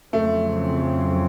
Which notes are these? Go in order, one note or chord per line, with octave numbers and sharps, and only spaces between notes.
F2 C#3 F#3 A3 C4